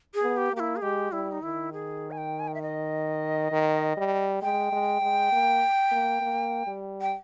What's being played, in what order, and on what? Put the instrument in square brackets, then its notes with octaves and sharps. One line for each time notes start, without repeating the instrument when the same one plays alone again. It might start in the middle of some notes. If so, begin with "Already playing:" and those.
[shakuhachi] G#4
[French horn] B3
[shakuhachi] G4
[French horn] A#3 [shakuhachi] G4
[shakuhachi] E4
G#4
[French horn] G#3 [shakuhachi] G4
[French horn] G3 [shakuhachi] E4
[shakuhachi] D#4
[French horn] D#3 [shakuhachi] E4
[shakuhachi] G#4
G#5
G5
G#5
G5
E5
D#5
[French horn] D#3
G3
[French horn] G#3 [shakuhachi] G5
[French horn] G#3
G#3
A#3
A#3
A#3
G3
[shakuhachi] G5